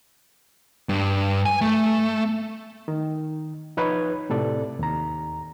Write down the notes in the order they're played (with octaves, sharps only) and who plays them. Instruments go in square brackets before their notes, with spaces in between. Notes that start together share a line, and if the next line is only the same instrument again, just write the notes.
[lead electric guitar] G2
G#5
A3
[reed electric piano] D#3
F3 D#4 B4 C#5 G#6
A2 C3 A4 D5
D#2 A#5